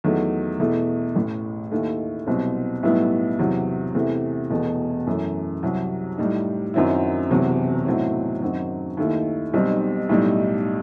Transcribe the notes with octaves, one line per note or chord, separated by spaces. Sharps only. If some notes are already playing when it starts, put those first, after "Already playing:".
E2 D#3 F#3 A3
E2 B2 A3 E4
A1 A2 E3
D#2 D#3 A3 E4
C2 B2 F#3 C4
B1 A2 G3 B3 E4
E2 C3 F#3
E2 C3 E3 A3
E1 E2 B2 A3
F#2 E3 A3
C2 C3 F#3
A2 G3 D#4
F#2 D#3 F#3 C4 E4
E1 E2 C3 F#3
B1 A2 F#3 C4 E4
F#2 D#3 F#3 C4
D#2 D#3 A3 E4
B1 B2 G3 C4 D#4
B1 A2 G3 D#4